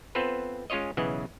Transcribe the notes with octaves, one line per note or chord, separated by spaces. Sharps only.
B3 C4 F4 A4 B4 C5
G#3 C#4 F4 C#5 D#5
B1 C#3 E3 D#5 F#5 G#5